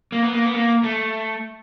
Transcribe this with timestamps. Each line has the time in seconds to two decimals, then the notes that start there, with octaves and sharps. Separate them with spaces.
0.12 A#3
0.23 B3
0.33 A#3
0.45 B3
0.54 A#3
0.84 A3